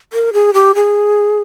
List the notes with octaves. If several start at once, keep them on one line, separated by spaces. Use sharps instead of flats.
A#4
G#4
G4
G#4